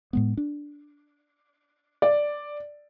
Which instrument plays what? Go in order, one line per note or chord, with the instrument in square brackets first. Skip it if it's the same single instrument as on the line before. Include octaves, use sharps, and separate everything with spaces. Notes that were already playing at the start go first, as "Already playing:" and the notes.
[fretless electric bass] A2 G#3 B3
D4
[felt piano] D5